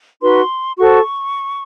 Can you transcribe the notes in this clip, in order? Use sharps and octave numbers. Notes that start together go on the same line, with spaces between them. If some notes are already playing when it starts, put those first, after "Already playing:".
D#4 F#4 B4 C6
F#4 A4 C5 C#6